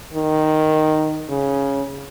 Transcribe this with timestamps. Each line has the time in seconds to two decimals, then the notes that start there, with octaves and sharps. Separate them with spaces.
0.14 D#3
1.30 C#3